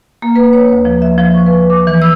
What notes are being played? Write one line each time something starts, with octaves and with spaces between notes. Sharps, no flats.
A#3
B4
C#5
D2
F3
E5
F3
C#6
B4
D6
E3
E6